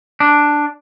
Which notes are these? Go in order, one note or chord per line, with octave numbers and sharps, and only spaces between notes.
D4